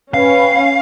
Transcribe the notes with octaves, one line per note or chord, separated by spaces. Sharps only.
C#4 B4 F5 G5 B5